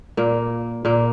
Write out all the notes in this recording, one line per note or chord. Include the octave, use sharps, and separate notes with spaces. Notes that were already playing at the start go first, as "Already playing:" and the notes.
A#2 A#3
A#2 A#3